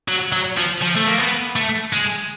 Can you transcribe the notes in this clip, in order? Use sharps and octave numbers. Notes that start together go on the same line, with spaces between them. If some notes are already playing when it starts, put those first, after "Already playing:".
F#3
F#3
F3
F3
A3
A#3
B3
A3
G#3